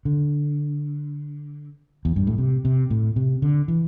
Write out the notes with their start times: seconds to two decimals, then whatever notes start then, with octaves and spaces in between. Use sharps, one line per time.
0.05 D3
2.05 E2
2.16 G2
2.27 A2
2.38 C3
2.65 C3
2.90 A2
3.16 C3
3.42 D3
3.68 E3